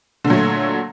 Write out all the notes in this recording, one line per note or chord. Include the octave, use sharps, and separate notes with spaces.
A#2 D3 F#3 A3